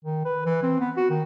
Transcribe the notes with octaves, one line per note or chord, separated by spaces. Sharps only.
D#3
B4
E3
C4
B3
F#4
D#3